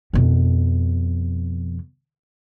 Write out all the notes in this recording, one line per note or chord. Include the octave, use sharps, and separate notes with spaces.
F2 B2